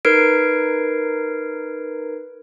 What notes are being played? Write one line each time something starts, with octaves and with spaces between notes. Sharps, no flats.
D#4 A#4 B4 G#6 C7 D7